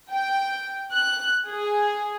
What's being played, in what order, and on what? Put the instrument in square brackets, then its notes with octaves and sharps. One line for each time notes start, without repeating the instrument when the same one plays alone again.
[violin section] G5
F#6
G#4